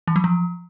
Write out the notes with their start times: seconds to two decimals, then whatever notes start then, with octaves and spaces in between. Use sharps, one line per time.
0.07 E3
0.16 F#3
0.24 F3